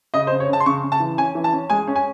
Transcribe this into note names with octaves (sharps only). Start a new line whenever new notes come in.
C#3 D#5
C5
C#3
C#5
C#3 A5
C6
C#3 C#6
C#3
A5
E3
C#4 G#5
E3
A5
C#4
G#3 G#5
C#4
G#5